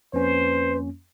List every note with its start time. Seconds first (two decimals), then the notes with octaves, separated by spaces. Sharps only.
0.13 F2 A#3 C#4 B4 C5